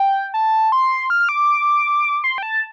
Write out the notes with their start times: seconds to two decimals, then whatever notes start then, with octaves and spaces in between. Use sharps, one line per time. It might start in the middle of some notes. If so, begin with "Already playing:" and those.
Already playing: G5
0.34 A5
0.72 C6
1.10 F6
1.20 F6
1.29 D6
2.24 C6
2.38 G5
2.43 A5